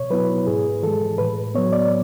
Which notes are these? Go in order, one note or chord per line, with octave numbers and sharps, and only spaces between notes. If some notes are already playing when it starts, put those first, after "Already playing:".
Already playing: B2 C#5
F#3 B3 E4 B4
G#2 G#4
E3 G#3 A4
A2 B4
F#3 B3 C#5
D5